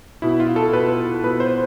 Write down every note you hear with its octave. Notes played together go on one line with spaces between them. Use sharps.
B2 E4
F4
A4
B2 B4
B2 B4
C5